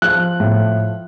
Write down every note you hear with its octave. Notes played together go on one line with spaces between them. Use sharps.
F3 F#6
A2